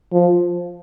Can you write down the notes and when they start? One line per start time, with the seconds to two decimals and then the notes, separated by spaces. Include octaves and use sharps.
0.13 F3